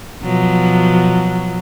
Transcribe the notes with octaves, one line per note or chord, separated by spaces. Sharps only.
B2 F3 F#3